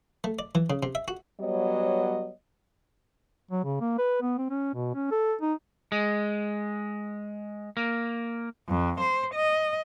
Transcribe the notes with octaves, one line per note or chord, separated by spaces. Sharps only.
A3
D5
E3
C#3
C3
E5
F#4
F#3 G3 B3 C#5 D#5
F#3
C#3
A#3
B4
B3
C4
C#4
B2
C#4
A4
D#4
G#3
A#3
F2
C5
D#5